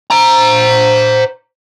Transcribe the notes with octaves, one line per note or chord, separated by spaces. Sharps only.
C5 A#5